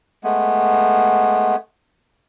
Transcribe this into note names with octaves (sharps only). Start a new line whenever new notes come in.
G#3 A3 B3